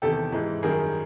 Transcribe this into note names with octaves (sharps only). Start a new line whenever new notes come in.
E2 C3 D#3 G4 A4
G#2 E3 G#3
F#2 D#3 G3 G#4 A#4